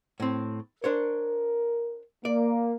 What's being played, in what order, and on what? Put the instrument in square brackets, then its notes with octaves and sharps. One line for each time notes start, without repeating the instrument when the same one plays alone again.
[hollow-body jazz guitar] A2 C4
[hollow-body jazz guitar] D4 C5 C#5 [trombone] A#4
[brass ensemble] A#3 [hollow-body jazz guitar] D5